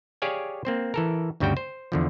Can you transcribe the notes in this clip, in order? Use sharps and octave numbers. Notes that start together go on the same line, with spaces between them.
G4 G#4 C#5 D5 F5 G#5
A#3 C4 C5
E3 A4 A#4
D2 G2 C#3 G3 F#4 G5
C5
E2 D3 F3